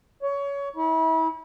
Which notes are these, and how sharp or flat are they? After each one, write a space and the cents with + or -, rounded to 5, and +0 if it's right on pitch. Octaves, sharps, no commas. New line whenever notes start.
C#5 +20
E4 -35